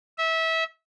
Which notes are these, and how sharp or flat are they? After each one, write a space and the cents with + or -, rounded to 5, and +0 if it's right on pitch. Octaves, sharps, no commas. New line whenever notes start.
E5 -25